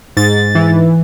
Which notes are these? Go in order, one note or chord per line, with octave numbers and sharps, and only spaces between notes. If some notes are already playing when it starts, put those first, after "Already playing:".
G#2 A6
E3